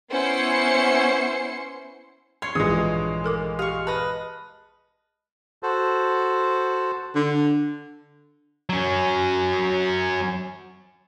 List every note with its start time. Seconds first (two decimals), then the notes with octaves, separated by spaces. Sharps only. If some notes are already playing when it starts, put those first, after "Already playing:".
0.10 B3 C#4 E4 C5 C6 C#7
2.42 C#5 C6 G#6
2.55 A#1 G2 E3 G#3 G#4 D#6
3.24 A4 A#4 D6
3.59 G4 F5 C#6
3.87 B4 D#5 A5 F6
5.63 F#4 A4 C5
7.15 D3
8.69 F#3 C#4